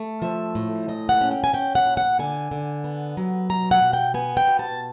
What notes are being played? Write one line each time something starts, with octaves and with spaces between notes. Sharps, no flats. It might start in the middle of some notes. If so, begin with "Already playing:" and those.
Already playing: A3
F3 E5
A2
A#2 D#5
F#5
C#4
G5
G#5
C#4 G5
F#5
A#2
F#5
D3 G#5
D3
B3
F#3
B2 A#5
F#5
B2
G5
B3 G#5
G5
B2
A5